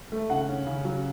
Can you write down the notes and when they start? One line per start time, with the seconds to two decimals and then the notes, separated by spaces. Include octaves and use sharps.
0.12 A3
0.30 C#3 F#5
0.49 C#4
0.67 C#3
0.85 F#3